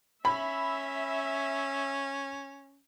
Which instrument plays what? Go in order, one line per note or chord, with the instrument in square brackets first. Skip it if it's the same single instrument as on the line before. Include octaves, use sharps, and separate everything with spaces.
[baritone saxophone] C#4 [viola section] E5 [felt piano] B5